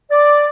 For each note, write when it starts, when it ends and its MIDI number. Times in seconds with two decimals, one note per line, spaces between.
0.11 0.49 74